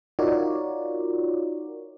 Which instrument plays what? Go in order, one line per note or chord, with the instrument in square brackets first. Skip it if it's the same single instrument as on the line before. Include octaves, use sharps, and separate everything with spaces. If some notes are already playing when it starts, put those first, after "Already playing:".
[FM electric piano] D#4 F4 F#4 A#4 C#5 D5